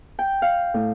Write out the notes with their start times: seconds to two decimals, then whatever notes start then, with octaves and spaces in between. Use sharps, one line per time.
0.19 G5
0.42 F5
0.74 A2